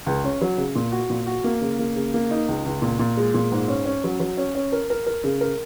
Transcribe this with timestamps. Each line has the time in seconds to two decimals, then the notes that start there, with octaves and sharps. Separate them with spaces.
0.06 C#2
0.24 C#4
0.41 F#3
0.57 C#3
0.75 A#2
0.92 F#4
1.10 A#2
1.27 F#4
1.44 A#3
1.61 C#3
1.79 A#3
1.96 C#3
2.14 A#3
2.31 D#4
2.48 C#2
2.66 C#2
2.82 A#2
2.99 A#2
3.17 G#3
3.34 A#2
3.52 G#2
3.68 C#4
3.85 C#4
4.04 F#3
4.20 F#3
4.37 C#4
4.55 C#4
4.72 A#4
4.90 A#4
5.06 A#4
5.24 C#3
5.41 A#4